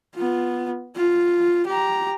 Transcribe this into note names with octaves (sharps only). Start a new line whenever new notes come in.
B3 F4
F4
G4 A#5